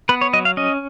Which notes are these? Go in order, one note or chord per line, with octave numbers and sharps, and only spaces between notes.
B3 B4
C#5
F#3 D#5
F5
C#4 D#5